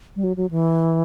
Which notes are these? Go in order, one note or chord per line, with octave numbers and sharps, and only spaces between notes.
G3
F#3
F#3
E3